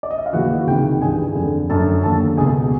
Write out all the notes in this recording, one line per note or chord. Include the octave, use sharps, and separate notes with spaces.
D5
D#5
E5
F5
D#2 C#3 E3 F#4 F#5
C#2 C3 D#3 G4 G5
G2 E3 G#4 G#5
F2 D3
F#2 D3 A4 A5
D#2 D3 A4 A5
C#2 B2 G#4 G#5